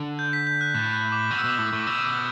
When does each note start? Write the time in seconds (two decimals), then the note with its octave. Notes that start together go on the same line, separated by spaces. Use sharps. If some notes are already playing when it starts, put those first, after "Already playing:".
Already playing: D3
0.19 G6
0.33 B6
0.47 G6
0.61 F#6
0.74 A2 F#6
0.93 F#6
1.12 D6
1.31 B2
1.39 E6
1.44 B2 D6
1.58 A2
1.67 D6
1.73 A2
1.82 D6
1.87 B2 E6
2.00 E6
2.05 D6